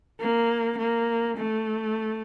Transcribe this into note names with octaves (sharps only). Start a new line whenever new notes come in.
A#3
A#3
A3